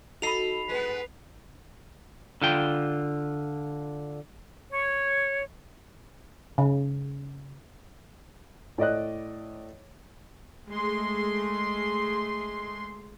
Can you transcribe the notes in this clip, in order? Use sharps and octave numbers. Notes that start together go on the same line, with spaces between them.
D#4 F#4 A4 D#5 B5 C7 F7
G#3 B3 B4
D3 F4 G5
C#5
C#3
A2 D5 D#5 F#6
G#3 A3 C6